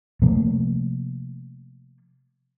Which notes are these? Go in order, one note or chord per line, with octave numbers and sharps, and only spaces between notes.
C3 F3 A3 A#3